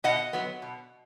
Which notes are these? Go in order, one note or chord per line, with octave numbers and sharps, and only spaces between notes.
B2 D#5 F#5
F#3 B3
B2